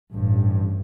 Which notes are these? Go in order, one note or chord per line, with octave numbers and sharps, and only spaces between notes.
A1 G2